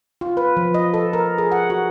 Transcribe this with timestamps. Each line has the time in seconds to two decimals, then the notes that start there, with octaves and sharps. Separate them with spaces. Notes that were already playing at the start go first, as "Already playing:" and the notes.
0.21 F4
0.37 B4
0.57 F3
0.74 D#5
0.94 A4
1.13 A#4
1.38 G#4
1.52 F#5
1.70 F#4